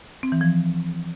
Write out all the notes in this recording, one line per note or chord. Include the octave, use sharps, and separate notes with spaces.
C4
E3
F3